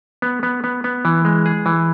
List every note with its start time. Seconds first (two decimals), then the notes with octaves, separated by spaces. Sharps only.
0.22 B3
0.43 B3
0.64 B3
0.84 B3
1.05 E3
1.25 G#3
1.46 G#4
1.66 E3